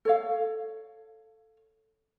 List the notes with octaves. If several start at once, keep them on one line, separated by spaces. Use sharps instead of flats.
A4 C#5 F5